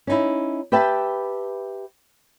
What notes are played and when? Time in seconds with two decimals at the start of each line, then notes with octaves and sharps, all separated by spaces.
0.07 C#4 D#4 E4
0.72 G4 B4 E5 G5 A5